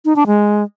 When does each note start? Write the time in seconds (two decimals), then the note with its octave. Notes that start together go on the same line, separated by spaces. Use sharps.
0.05 D#4
0.16 D4
0.27 G#3